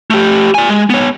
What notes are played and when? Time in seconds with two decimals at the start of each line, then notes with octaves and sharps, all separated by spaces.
0.10 A3 G4
0.55 D5 G#5
0.69 G#3
0.90 B3 C#5